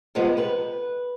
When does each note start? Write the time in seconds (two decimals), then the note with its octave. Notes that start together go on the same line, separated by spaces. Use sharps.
0.15 C3 F3 G#3 B3
0.37 C3 B4